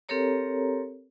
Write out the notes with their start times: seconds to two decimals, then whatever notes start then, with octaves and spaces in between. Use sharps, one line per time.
0.09 C4 G4 A4 A#4 C#5 A#5